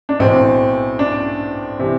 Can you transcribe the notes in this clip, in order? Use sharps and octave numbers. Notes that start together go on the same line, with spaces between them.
D4
B1 A2 E3 C4
D4
C3 E3